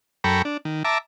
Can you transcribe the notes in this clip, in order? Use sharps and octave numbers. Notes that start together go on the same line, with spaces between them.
F#2 A4 G5 A#5 B5 C#6
D4
D#3
E5 A5 A#5 D6